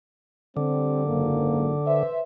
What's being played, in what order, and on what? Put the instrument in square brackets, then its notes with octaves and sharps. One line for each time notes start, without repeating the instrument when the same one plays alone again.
[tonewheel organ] D3 [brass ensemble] G3 C4
[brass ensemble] F#1 G#2 A#3
B4 C5 E5